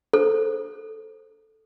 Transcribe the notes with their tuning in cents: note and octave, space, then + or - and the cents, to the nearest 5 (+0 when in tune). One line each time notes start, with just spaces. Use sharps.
A4 +0 C5 +0